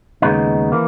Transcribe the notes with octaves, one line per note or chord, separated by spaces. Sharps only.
D#2 C#3 G#3 B3 D#4
E3 A#3